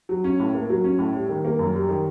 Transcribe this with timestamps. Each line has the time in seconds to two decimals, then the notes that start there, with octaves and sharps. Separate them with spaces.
0.09 F#3
0.24 C#4
0.40 A2
0.55 A#3
0.70 F#3
0.84 C#4
0.99 A2
1.15 G3
1.29 D#3
1.45 A#3
1.59 F#2
1.74 G3
1.89 D#3